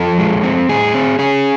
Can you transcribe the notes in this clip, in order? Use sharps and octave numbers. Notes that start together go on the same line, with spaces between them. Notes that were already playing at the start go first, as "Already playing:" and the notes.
Already playing: F2 F3 A4
G#3
C4
A2 G#4
C4
C#4 G#4